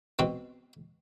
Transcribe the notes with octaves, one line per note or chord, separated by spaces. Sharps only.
B2 C4